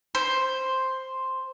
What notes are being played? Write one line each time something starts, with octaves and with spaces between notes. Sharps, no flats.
C5